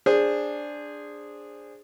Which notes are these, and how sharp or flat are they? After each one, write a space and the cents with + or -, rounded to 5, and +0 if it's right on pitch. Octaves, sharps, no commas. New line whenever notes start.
D4 +0 G#4 -10 C5 +10